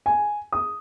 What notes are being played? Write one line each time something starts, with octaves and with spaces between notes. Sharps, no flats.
G#5
D#6